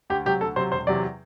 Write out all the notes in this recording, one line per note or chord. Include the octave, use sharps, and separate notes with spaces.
D2 G4
C3 F#3 G4
D2 A4
C3 F#3 C5
E1 C5
E2 C3 F#3 D5